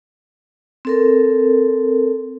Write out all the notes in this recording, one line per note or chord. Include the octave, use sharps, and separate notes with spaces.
C4 A4 A#4